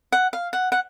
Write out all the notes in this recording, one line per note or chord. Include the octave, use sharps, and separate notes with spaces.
F#5
F5
F#5
F#5